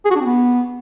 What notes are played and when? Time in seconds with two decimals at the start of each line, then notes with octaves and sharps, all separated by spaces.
0.05 G#4
0.10 F#4
0.16 D4
0.21 C4
0.26 B3